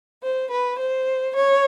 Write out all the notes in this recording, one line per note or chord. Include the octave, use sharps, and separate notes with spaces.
C5
B4
C5
C#5